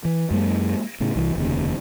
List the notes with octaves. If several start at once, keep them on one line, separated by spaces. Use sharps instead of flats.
E3
F#2 G#3 A#3
A2 C#3
C2 E3
F1 D#2 C#3